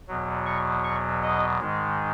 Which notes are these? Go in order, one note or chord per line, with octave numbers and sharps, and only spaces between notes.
E2 B2 F#3
C#6
C#6
D#5
G#2 D#3 G#3